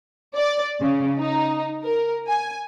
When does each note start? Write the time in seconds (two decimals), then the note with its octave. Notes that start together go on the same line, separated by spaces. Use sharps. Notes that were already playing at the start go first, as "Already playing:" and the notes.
0.35 D5
0.80 C#3
1.18 D#4
1.83 A#4
2.28 G#5